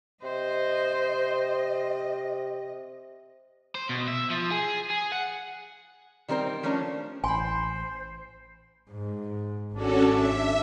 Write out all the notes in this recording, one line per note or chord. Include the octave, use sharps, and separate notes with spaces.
C3 C5 D#5
C5
B2
E5
F3
G#4
G#4
F#5
D#3 G3 C4 A#4 C5
F3 A3 C#4 D4 A#4
A1 C5 G#5 B5 C6
G#2
G#1 C#4 D4 F#4 A4
E5